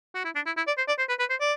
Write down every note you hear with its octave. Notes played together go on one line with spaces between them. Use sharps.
F#4
E4
D4
E4
E4
D5
C5
D5
C5
B4
B4
C5
D5